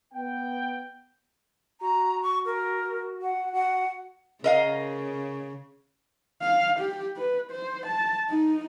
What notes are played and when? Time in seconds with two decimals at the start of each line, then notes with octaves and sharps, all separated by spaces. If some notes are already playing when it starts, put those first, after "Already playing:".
0.13 B3 G5
1.81 F#4 A#5
2.22 C#6
2.46 A#4
3.22 F#5
3.53 F#4 F#5
4.44 C#3 A#4 D#5 F5
6.43 F5
6.79 G4
7.17 B4
7.51 C5
7.86 A5
8.29 D#4